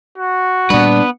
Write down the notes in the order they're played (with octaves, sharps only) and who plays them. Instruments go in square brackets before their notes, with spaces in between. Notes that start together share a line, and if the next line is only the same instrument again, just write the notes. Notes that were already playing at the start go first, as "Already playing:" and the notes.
[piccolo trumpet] F#4
[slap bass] A#2 G3 [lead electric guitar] B3 B4 [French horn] D4